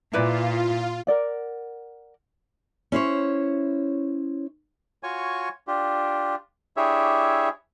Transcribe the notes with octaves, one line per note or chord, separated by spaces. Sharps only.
A#2 E4 F4 B4 D5
A#4 D5 F#5
C#4 E4 C5 C#5
F4 F#4 C#5 G#5 C#6
D4 F4 G4
D4 E4 G4 G#4 C#5 E5